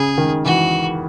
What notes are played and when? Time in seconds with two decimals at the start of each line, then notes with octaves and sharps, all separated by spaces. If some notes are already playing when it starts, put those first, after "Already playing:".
Already playing: C#3 G#4
0.18 D#3
0.45 E3 F#4